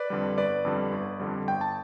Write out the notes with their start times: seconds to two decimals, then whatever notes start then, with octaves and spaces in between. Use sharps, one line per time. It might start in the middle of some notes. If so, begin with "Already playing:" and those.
Already playing: B4 D5
0.10 F2 D3 G3
0.38 G1 B4 D5
0.65 F2 D3 G3
0.92 G1
1.20 F2 D3 G3
1.47 G1 G5
1.61 A5